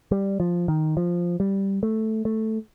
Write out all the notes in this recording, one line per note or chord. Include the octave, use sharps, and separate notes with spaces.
G3
F3
D#3
F3
G3
A3
A3